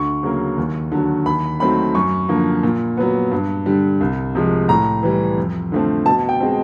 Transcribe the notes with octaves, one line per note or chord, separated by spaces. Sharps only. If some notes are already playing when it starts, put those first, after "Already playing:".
Already playing: D2 C#6
C#3 F#3 A#3
D#2
D3 F#3
D#2 B5
D#3 F#3 A3 C4 B5
F#2 C#6
D3 F3 A#3
A#2
F#3 B3
G2
D3 G3
C2
C3 F3 G#3
A2 A#5
E3 G3
F2
D3 F3 A3 C4
B2 A5
G5
G#3 C4